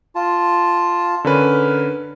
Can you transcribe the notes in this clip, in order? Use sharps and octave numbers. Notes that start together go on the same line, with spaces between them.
F4 A5
D3 C#4 A#4 B4